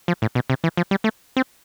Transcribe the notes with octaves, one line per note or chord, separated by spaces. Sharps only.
F3
A2
B2
C3
E3
F3
G3
A3
C4